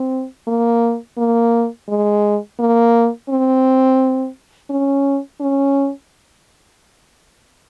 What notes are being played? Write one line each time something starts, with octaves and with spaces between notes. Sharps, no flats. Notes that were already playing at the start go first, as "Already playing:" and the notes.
Already playing: C4
A#3
A#3
G#3
A#3
C4
C#4
C#4